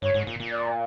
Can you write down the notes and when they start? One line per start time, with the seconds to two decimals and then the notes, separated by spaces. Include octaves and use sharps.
0.02 G2 C#5
0.14 G#2
0.27 A#2
0.40 A#2
0.52 D5